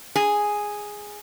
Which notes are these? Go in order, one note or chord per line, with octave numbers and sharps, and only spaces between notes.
G#4